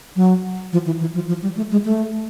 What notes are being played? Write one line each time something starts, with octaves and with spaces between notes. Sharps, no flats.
F#3
F3
E3
E3
F3
F3
G3
A3
G#3
A3